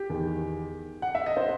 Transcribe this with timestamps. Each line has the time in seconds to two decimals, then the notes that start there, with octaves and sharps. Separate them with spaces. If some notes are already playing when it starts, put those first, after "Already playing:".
Already playing: G4
0.10 E2 D#3
1.02 F#5
1.15 E5
1.26 D#5
1.37 C5